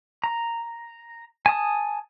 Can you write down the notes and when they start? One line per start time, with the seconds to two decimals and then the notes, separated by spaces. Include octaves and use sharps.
0.24 A#5
1.46 G#5 A5 D#6